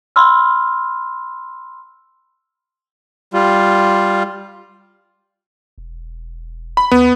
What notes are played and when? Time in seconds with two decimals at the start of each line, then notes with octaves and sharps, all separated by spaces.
0.16 B5 C6 E6 F6
3.34 G3 F4
5.78 E1
6.77 B5
6.91 D#2 B3